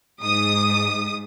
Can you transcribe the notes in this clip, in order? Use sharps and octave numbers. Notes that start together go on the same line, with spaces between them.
G#2 D#6